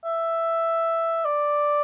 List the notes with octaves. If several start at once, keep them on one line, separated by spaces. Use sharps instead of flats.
E5
D5